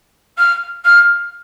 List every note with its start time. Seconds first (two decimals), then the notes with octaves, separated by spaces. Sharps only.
0.38 F6
0.85 F6